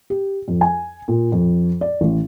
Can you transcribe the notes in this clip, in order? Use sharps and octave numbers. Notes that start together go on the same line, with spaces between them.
G4
F2
G#5
A#2
F2
D5
A1